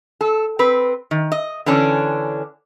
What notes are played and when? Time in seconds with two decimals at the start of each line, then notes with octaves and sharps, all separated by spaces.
0.21 A4
0.59 C4 B4
1.11 D#3
1.32 D#5
1.66 D3 E3 C#4 D4